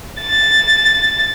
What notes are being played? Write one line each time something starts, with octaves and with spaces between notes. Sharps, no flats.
A6